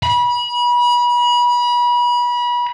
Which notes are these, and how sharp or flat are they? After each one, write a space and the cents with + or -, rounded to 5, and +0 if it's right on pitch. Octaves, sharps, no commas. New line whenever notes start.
B5 -30